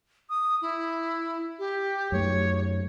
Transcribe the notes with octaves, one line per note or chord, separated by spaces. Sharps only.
D#6
E4
G4
F#2 A3 C#5